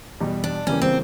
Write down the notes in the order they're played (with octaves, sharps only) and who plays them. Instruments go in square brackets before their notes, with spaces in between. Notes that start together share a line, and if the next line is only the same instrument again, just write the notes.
[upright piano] E2 B2 G3
[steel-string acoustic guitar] D4
[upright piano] E2 C#3 E3 G3 A#3 [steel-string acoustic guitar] C#4
[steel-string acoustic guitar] C4